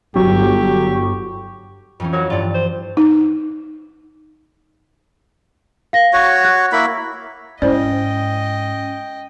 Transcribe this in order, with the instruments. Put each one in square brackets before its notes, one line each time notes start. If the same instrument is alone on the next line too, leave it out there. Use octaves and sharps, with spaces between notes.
[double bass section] G1 [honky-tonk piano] F#3 [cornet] G4 [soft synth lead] C#6
[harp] F2 E3 C#4
[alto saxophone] F#3 [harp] A#4
[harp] G2 D5 [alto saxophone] F4
[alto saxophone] C5
[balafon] D#4
[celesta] F5 A#6
[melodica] F#4 C#5
[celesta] F#6
[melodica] A#3 E4 B5
[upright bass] G#2 [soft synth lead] C#4 [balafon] E4 C5 D5 [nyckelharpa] D#5 G5